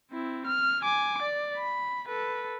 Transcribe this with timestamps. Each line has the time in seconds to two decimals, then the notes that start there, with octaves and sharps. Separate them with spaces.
0.12 C4 E4
0.46 F6
0.82 G#5 D6
1.22 D5
1.57 B5
2.08 A4 B4